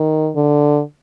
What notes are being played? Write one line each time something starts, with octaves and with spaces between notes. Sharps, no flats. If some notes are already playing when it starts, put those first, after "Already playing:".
Already playing: D#3
D3